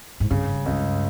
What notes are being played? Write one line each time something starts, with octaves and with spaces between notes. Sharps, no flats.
G#2
G2 C#3
C#2